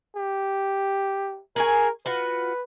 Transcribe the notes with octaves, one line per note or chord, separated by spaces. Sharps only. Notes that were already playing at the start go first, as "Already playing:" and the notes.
G4
G#4 A#4 C#5 G#5
F4 F#4 B4